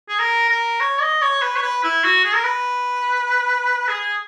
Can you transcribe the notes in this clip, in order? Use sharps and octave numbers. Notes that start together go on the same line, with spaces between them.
G#4
A#4
A#4
C#5
D#5
C#5
B4
C#5
B4
E4
F#4
G#4
A#4
B4
G#4